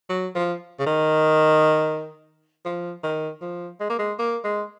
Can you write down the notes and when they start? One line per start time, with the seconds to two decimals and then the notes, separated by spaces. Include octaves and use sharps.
0.09 F#3
0.35 F3
0.79 C#3
0.86 D#3
2.65 F3
3.03 D#3
3.42 F3
3.80 G#3
3.90 A#3
3.99 G#3
4.19 A#3
4.44 G#3